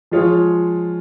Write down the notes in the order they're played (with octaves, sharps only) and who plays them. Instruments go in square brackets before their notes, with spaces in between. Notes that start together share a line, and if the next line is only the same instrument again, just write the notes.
[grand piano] F3 G#3 F4 G#4 C#5